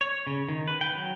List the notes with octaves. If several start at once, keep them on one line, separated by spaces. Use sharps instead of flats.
C#5
C#3
D#3
B4
G5
F#3